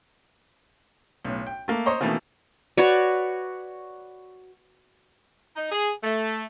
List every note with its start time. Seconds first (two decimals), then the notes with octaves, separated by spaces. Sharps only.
1.24 B1 A2
1.47 G5
1.68 A3 A#3
1.86 C5 C#5 D#5 A#5
2.01 B2 D#3 E3 A3 A#3
2.77 F#4 B4 C#5 D5
5.57 D#4
5.72 G#4
6.02 A3